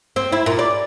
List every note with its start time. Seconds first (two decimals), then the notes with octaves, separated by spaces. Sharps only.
0.16 C4
0.32 E4
0.46 A#2
0.59 D5